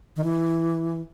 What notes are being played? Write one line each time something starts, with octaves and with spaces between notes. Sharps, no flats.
D#3
E3